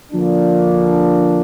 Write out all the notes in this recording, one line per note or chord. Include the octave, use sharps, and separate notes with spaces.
D3 F3 A#3 D4